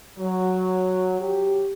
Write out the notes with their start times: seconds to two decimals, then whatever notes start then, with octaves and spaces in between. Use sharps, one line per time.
0.19 F#3
1.20 G4